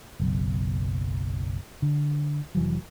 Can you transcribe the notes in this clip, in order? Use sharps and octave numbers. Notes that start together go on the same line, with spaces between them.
F#1 B1
D3
F1 E3 F#3